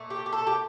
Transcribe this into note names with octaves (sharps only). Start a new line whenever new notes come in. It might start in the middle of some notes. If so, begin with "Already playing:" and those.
Already playing: A#2 A3
G4
G4
A4
G4